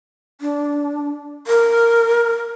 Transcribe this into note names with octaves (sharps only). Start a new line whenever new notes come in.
D4
A#4